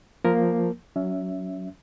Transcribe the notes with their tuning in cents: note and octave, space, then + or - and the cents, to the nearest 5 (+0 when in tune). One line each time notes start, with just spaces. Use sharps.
F3 +0 A#3 +0 A#4 +0
F#3 +0 C#4 +25 E5 +0